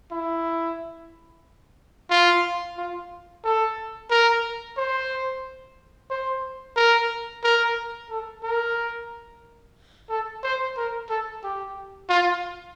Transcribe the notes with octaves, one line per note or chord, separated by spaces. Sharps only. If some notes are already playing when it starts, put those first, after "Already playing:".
E4
F4
F4
A4
A#4
C5
C5
A#4
A#4
A4
A#4
A4
C5
A#4
A4
G4
F4